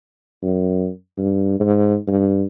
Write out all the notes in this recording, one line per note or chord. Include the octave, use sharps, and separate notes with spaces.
F#2
G2
G#2
G2